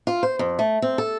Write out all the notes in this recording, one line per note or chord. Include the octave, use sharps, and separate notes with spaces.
F4
C5
F2
A3
C4
A4